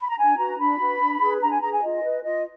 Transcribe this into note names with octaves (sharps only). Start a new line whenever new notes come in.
B5
A#5
D4 G#5
F#4 B4 A#5
D4 B5
F#4 B4
D4
G#4 B4
D4 A#5
G#5
G#4 B4 A#5
G#5
F4 D#5
B4
F4 D#5